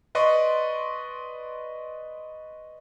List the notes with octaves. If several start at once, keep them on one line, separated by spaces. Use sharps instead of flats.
B4 D5 D#5 C6 C#6